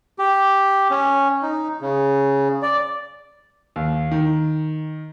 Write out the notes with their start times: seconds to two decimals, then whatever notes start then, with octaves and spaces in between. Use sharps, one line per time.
0.19 G4
0.90 C#4
1.42 D#4
1.81 C#3
2.62 D5
3.76 D#2
4.12 D#3